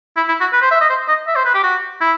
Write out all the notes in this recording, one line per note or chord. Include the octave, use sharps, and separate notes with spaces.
E4
E4
F#4
B4
C5
E5
D#5
C5
D#5
E5
C5
B4
G4
F#4
E4